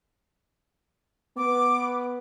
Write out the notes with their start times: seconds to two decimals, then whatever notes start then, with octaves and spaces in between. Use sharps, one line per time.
1.37 B3 D6